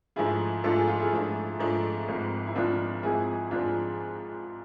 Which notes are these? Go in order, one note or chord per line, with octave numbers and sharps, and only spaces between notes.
G#2 F3 A3 D4 E4 F4 G#4
G#2 F3 A3 D4 F4 A4
G#4
F4
E4 G#4
G#2 F3 A3 D4 F4
G#2 F3 A3 D4 F4
G#1 G#2 F3
E4
G#1 G#2 F3 D4 F4
G#1 G#2 F3 E4 G#4
G#1 G#2 F3 D4 F4